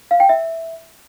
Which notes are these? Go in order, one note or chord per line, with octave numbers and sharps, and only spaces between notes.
F5
G5
E5